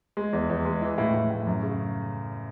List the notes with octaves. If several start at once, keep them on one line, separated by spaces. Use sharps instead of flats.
G#3
E2
E2
G#3
E3
A2
A2
A2
F#2
C#3